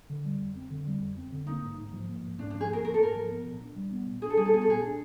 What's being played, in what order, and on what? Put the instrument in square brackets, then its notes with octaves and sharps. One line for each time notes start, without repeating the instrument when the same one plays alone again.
[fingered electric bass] D3
G3
F2
C4
D3
G3
F2
C4
D3
[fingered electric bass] A#3 [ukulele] D#4
[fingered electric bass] G#2
G#2
F3
A#3
G#2
[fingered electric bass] G#2 [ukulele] D4
[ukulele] D4
[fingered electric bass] F3
[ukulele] G#4
[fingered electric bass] A#3 [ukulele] A#4
[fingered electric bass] G#2 [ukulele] A#4
[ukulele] A4
[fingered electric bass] G#2 [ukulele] A#4
[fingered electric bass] F3
B3
A#2
D4
G3
B3
A#2
[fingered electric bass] D4 [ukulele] G#4
[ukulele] A4
[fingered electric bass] G3 [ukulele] G#4
[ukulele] A4
[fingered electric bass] B3 [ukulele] G#4
[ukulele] A4
[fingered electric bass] A#2 [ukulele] G#4
[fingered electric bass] D4